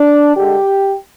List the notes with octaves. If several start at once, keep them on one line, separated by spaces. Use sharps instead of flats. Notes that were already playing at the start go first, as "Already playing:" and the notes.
Already playing: D4
D3 G#3 G4